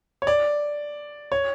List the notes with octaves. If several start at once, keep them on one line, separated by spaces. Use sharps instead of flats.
C#5
D5
C#5